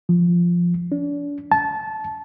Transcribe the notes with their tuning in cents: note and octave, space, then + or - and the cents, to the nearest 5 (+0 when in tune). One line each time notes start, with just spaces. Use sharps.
F3 -5
D4 -40
A5 -15